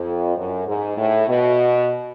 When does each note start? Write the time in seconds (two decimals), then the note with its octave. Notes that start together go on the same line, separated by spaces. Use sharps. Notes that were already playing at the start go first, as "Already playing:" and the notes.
Already playing: F2
0.37 F#2
0.67 G#2
0.97 A2
1.28 B2